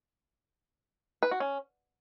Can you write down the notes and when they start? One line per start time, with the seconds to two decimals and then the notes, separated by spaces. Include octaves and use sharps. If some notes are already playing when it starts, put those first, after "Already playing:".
1.23 B4
1.31 F#4
1.40 C#4